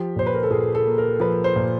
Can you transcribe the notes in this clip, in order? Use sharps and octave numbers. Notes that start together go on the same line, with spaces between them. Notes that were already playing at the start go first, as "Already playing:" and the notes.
Already playing: F3 G4
A#2 C5
B4
A#4
A4
A#2 G#4
A4
A#3
A#4
F3 B4
C5
A#2